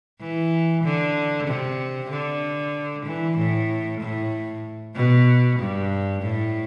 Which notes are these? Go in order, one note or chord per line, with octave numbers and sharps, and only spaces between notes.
E3
D3
C3
D3
E3
A2
A2
B2
G2
A2